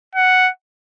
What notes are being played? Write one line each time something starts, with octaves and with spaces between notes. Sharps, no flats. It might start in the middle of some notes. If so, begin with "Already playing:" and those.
F#5